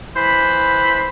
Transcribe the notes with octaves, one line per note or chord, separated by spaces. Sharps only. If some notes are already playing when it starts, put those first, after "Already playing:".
E3 C5 B5